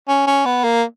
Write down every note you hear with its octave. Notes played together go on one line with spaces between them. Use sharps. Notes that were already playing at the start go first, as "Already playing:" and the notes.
C#4
C#4
B3
A#3